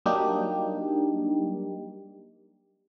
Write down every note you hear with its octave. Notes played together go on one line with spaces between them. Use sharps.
F#3 G3 A#3 D4 D#4 G4